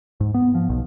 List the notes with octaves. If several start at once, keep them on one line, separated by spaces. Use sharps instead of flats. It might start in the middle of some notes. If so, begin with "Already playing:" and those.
G#2
B3
F3
B1